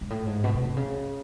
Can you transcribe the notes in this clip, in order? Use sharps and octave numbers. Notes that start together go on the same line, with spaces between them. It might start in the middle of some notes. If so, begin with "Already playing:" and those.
G#2
A2
G#2
B2
B2
C3
C#3